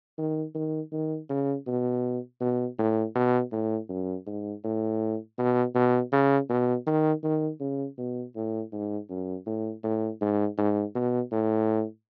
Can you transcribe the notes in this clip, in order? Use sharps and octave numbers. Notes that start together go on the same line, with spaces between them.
D#3
D#3
D#3
C#3
B2
B2
A2
B2
A2
F#2
G#2
A2
B2
B2
C#3
B2
D#3
D#3
C#3
B2
A2
G#2
F#2
A2
A2
G#2
G#2
B2
A2